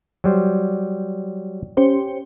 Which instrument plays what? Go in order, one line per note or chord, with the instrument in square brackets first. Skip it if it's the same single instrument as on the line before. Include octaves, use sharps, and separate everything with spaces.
[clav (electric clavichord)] F#3 G3 C5
[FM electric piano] C#4 G4 C5